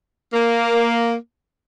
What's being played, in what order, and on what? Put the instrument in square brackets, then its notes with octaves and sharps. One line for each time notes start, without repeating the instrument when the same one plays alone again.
[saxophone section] A#3